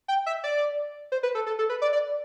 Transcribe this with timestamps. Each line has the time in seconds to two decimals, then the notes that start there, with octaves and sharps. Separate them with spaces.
0.08 G5
0.26 E5
0.44 D5
1.12 C5
1.23 B4
1.35 A4
1.47 A4
1.59 A4
1.69 B4
1.82 D5
1.93 D5